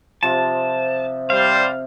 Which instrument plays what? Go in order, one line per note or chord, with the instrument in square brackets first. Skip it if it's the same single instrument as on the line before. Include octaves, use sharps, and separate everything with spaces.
[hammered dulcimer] C3 F3 [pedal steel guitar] A5
[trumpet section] G3 C5 [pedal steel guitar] F5